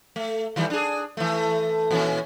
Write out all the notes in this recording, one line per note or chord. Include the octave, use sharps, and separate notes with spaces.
A3
D#3 E3 G3
D4 G#4
E3 A3
A#2 E3 C#4